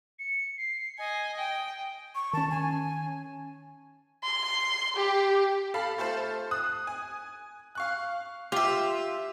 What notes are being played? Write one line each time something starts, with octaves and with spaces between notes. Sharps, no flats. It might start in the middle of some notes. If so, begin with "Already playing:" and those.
C#7
C7
D#5 G#5
G5
C#6
D#3 C#4 A5
G#5
C6
G4
A4 F5 B5
A3 F4 A4 C5
D#6 F#6
G#5
F5 C#6 F#6
F4 G4 E5